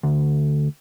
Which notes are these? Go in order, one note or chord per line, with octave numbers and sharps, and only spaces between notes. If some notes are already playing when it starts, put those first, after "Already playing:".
D2